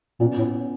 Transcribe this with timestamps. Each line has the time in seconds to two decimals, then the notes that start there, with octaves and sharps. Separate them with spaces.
0.20 A#2 B3 C#4
0.38 A2